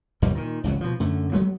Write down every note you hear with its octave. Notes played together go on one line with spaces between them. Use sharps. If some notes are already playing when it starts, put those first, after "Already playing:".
G1 D#2 B2 G3
A#2 D#3
G#1 C#2 F#3
B2 F3
F#2 D3 A3
F#3 G#3 A3 B3